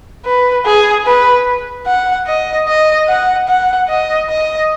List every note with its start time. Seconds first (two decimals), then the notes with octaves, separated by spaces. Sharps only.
0.25 B4
0.66 G#4
1.06 B4
1.86 F#5
2.27 D#5
2.67 D#5
3.08 F#5
3.48 F#5
3.89 D#5
4.30 D#5